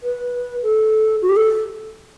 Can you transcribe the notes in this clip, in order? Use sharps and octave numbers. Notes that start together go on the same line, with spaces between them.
B4
A4
F#4
G4
A4